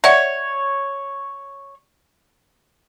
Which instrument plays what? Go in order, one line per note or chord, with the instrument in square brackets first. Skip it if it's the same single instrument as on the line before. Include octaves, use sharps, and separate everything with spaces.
[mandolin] C#5 [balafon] D5 E5 F#5